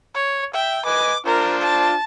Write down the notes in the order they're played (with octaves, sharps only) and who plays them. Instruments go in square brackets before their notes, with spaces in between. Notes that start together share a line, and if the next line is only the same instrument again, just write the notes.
[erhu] C#5
[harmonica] E5 [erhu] G5
[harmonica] B4 D#5 G#5 [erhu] D6
[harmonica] D4 F4 C5 [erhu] A#4
[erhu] A5